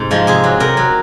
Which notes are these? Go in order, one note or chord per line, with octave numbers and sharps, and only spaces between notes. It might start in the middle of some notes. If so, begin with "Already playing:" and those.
Already playing: G#2 C3 D#4
F3 G#3
C3 G#4
F#3
C3 A#4
F#3